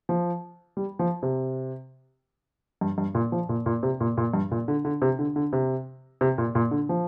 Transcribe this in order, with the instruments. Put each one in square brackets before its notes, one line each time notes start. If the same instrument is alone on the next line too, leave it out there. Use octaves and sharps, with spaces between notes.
[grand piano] F3
G3
F3
C3
G2
G2
A#2
F3
A#2
A#2
C3
A#2
A#2
G2
A#2
D3
D3
C3
D3
D3
C3
C3
A#2
A#2
D3
F3